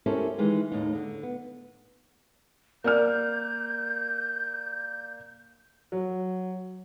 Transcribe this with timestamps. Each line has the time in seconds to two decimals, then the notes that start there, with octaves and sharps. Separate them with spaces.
0.06 C#4 E4 G4 A4 A#4 C5
0.38 D#3 E3 G#3
0.72 D#2 A2 D#4
0.95 D3
1.23 B3
2.84 A#3 D5 F6 G6
5.92 F#3